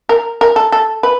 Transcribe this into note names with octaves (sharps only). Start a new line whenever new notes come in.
A#4
A#4
A4
A4
B4